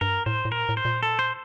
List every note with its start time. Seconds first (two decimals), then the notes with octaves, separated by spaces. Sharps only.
0.01 G2 A#4
0.26 A2 C5
0.45 A2
0.52 A#2 A#4
0.69 A2
0.77 C5
0.85 A#2
1.03 A4
1.19 C5